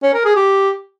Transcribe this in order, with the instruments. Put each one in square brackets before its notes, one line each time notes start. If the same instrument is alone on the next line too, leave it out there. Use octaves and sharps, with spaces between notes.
[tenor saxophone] C#4
A#4
G#4
G4